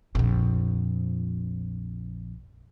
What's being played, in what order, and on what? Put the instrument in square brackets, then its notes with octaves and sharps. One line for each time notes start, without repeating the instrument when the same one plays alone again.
[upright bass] A#1 F2